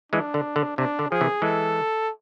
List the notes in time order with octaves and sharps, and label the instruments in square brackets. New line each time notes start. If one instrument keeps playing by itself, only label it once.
[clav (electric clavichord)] E3 G#3 [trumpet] D4
[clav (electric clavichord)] D3
D3
[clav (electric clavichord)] C3 [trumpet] D4
[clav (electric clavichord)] D3
[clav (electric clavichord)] F3 [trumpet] G#4
[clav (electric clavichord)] C3 E3
[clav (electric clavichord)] E3 G#3 [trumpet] A4